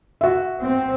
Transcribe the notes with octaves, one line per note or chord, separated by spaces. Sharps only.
F#4 E5
C4